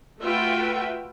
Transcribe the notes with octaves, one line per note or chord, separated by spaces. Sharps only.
A3 F4 F#4 B4 E5 G5